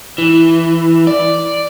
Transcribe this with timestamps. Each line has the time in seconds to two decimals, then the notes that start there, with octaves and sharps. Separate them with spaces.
0.18 E3
1.07 D5